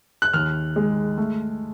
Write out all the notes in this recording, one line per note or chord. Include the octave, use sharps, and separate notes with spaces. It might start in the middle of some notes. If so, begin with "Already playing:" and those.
F#6
D#2 F6
G#3
A3